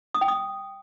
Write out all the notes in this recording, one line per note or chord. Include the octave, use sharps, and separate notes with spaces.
D#6
G5
D#6